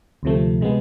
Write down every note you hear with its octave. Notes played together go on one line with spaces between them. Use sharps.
D2 C3 F3 A3
C3 G#3 B3